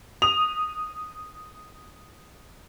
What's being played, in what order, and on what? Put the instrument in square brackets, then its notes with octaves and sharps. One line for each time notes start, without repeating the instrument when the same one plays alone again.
[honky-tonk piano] D#6 F7